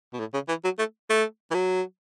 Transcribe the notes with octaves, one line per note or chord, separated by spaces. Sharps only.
B2
A2
C#3
E3
F#3
A3
A3
E3
F#3